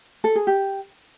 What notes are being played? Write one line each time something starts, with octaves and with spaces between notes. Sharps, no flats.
A4
G#4
G4